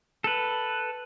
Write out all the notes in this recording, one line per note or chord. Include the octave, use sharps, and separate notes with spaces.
A4 B4